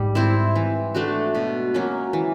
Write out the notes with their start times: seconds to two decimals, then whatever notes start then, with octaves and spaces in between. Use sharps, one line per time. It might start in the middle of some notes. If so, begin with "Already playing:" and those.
Already playing: G#2 G3
0.15 C4 E4
0.56 E3
0.95 A3 D4 F#4
1.35 B2
1.74 F#3 A#3 C#4
2.13 E3